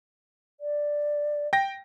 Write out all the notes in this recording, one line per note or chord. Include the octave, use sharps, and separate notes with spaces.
D5
G5 A#6